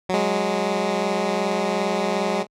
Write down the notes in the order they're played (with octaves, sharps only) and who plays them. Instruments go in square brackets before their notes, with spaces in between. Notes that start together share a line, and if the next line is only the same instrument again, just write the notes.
[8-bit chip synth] F#3 G#3